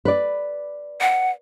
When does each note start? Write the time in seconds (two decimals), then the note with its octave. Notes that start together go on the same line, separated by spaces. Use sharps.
0.05 B4 D5
1.01 F#5